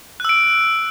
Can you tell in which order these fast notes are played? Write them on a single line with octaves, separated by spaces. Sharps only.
F#6 E6 D7